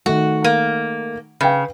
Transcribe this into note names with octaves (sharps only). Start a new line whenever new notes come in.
D#3 A3 F#4
A#3
C#3 B4 F5 G5